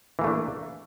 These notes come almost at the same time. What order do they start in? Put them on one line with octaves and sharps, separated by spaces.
E3 A#3 A3 D4